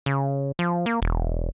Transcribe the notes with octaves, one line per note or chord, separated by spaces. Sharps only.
C#3
F3
A#3
E1